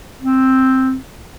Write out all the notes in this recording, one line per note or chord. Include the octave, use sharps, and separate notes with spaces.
C4